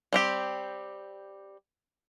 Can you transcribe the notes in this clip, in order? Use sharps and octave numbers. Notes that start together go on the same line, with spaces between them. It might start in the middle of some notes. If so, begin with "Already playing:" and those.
G3 C4 G4